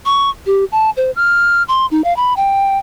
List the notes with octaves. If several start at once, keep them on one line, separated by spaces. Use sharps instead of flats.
C#6
G4
A5
C5
F6
C6
D#4
F5
B5
G5